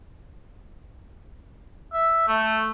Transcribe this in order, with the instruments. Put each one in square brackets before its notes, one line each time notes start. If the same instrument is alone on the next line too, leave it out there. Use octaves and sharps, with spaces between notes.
[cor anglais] E5
A3